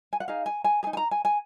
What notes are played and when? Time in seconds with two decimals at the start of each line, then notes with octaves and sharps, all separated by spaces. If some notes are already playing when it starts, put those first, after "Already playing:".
0.13 G#5
0.20 F#5
0.28 D#4 G#4 F5
0.46 G#5
0.64 G#5
0.83 G#4 G#5
0.87 D#4
0.93 G#5
0.97 A#5
1.11 G#5
1.25 G#5